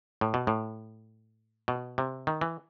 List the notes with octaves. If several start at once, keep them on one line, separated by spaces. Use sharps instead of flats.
A2
B2
A2
B2
C3
D#3
E3